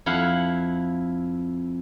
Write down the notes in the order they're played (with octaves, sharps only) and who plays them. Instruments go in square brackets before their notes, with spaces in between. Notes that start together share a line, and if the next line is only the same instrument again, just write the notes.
[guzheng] F2 E4 F5 F#5